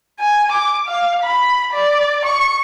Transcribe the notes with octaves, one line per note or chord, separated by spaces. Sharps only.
G#5
D6
F5
B5
D5
C#6